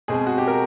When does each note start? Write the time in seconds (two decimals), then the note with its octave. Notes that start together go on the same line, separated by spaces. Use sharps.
0.08 B2 G#3 C4 G#4
0.27 F#4
0.38 G4
0.47 A#4